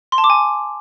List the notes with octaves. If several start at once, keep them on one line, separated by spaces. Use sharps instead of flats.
C6
A5
D6
G#5